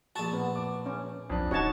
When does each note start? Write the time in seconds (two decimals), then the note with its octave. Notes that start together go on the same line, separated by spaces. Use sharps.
0.16 A#1 F#4 A5
0.33 B3
0.55 D6
0.86 C#4
1.30 B1 F2 D4
1.51 D1 C#3 D#4 F#4 C#5 A5